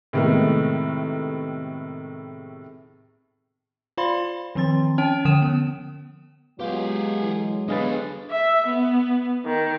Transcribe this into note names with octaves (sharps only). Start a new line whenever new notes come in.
A2 C3 D#3 G#3 A3 B3
F4 C5 D5 F5 B5 C6
D#3 F3 C4 C6 A6
C#4 C#5 G5 D7
D3 F3 G5 D#6 E7
B3
F#3 G#3 B3 F4 G4 G#4
E3
D3 G3 B3 G#4 B4 D#5 F5 A6
E5
B3
D#3